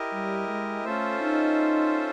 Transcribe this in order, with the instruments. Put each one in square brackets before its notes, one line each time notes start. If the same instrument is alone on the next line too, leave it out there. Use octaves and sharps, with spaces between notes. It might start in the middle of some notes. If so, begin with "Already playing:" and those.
Already playing: [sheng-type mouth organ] E4 G4 A#4 D#5
[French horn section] G3
G#3
[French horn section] A3 [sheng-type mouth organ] C#4 F4 A4 C5 E5
[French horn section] D#4